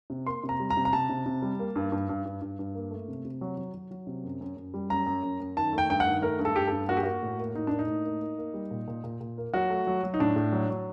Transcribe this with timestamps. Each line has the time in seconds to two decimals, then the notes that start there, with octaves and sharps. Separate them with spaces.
0.10 C3
0.26 A#3 C6
0.44 C3
0.49 A#5
0.60 G3
0.70 A#5
0.77 C3
0.85 A#5
0.93 C3 A5
1.09 C3
1.26 C3
1.42 G3
1.59 A#3
1.76 G2
1.92 G2
2.09 G2
2.25 G2
2.41 G2
2.59 G2
2.75 A#3
2.91 A3
3.08 C3
3.25 C3
3.41 F#3
3.57 F#3
3.74 F#3
3.91 F#3
4.07 C3
4.24 F#2
4.41 F#2
4.56 F#2
4.74 G3
4.90 F#2 A#5
5.06 F#2
5.23 F#2
5.40 F#2
5.57 D#3 A5
5.73 A3
5.78 G5
5.89 G2 G5
6.00 F#5
6.06 D#3
6.22 A3 A#4
6.39 G2
6.45 A4
6.55 G2 G4
6.67 G2 A4
6.88 A#3 F#4
6.97 G4
7.03 A#3 F#4
7.22 A2
7.39 A#3
7.54 A2 D#4
7.67 A#3 D4
7.79 D#4
7.88 A2
8.05 A#3
8.21 A#3
8.38 A#3
8.54 G3
8.71 A#2
8.88 A#2
9.04 A#2
9.21 A#2
9.38 A#3
9.53 F#3 F#4
9.70 A3
9.87 F#3
10.03 F#3
10.14 D#4
10.20 A2 D4
10.36 A2
10.52 F#3
10.69 F#3